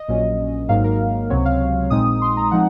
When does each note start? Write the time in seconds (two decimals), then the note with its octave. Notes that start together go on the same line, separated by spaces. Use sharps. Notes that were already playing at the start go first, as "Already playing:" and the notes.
Already playing: D#5
0.08 A#1 A#2 F#3 C#4
0.68 G#1 G#2 F#3 A#3 D#4 F5
0.84 A#4
1.30 C#2 C3 F#3 C4 C#5
1.45 F5
1.90 A#1 A#2 G#3 C4 D#4 D#6
2.22 C6
2.37 A#5
2.51 F3 G#3 C4 D#4 F#5